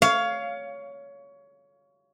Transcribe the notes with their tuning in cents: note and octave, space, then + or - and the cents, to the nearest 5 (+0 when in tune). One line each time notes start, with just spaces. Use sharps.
C#5 +20 F5 +0